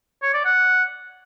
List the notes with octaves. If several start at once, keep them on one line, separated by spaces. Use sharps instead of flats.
C#5
D5
F#5